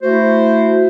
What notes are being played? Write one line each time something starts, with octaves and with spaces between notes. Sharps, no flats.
A3 E4 F#4 C5